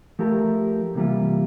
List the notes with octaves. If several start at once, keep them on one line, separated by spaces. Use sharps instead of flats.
F3 A3 E4 G4 A#4
C3 E3 G3 A#3 F4